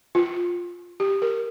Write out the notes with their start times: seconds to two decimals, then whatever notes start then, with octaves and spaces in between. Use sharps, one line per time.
0.15 F4
1.00 G4
1.22 A#4